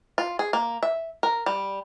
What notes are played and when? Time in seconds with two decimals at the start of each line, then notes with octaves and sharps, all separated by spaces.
0.18 F4
0.39 G#4
0.53 A#3
0.83 E5
1.23 A#4
1.46 G3